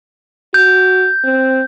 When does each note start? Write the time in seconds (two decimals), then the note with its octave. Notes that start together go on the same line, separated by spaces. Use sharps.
0.54 F#4 G6
1.24 C4